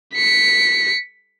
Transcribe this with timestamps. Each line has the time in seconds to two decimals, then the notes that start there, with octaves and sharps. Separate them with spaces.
0.14 B6 C#7